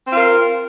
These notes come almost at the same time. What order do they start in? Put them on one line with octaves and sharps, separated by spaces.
C4 F4 A#4